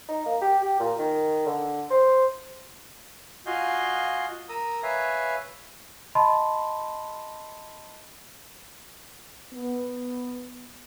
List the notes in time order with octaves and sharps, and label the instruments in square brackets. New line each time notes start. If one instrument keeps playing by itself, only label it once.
[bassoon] D#4
A#3
G4
G4
A#2
D#3
D3
C5
[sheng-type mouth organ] F4 F#4 D#5 F5 G#5 G6
A#4 A#5 D#6 E6
B4 C#5 E5 F5 G#5
[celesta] D#5 A5 B5 C6
[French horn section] B3